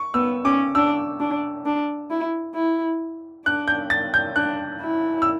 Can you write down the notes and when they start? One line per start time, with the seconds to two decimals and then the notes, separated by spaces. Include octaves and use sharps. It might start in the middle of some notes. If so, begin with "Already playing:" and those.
Already playing: C#6
0.14 B3 E6
0.45 C#4 D6
0.75 D4 E6
1.20 D4
1.66 D4
2.10 E4
2.55 E4
3.46 D4 F#6
3.68 G6
3.90 A6
4.14 G6
4.36 D4 F#6
4.81 E4
5.22 E6